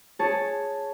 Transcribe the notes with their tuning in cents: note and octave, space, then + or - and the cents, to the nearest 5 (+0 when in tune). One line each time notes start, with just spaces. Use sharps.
G#4 +0 C#5 +0 A5 +0